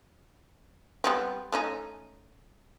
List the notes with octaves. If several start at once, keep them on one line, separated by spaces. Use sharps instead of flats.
G3 B3 C4
A3 C#4 D#4